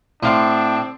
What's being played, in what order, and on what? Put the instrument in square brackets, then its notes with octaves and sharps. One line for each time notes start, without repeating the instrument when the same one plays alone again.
[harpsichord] A2 [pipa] D3 F5 C6 [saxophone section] C4 [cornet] D4